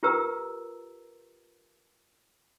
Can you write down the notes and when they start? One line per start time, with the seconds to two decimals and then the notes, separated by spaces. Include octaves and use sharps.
0.03 F4 G4 A#4 B4 A#5 E6